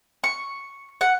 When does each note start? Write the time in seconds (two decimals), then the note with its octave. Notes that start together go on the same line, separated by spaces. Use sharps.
0.24 C#6
1.01 F#5